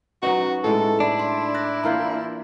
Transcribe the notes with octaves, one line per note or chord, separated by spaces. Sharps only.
F#3 C#4 D#4 F#4 B4 A#5
A2 G#3 A4
D4 E4
C6
F#6 A6 A#6
E3 A#3 F4 A#5 F6 G6